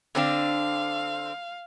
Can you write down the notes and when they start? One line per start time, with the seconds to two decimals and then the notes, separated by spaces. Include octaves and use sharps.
0.15 D3 C4 D4 F5